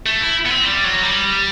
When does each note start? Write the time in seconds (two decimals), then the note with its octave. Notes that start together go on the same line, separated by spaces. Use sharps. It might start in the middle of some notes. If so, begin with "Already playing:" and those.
0.06 A3
0.21 E4
0.46 B3
0.50 C4
0.64 G3
0.84 F#3
1.03 G3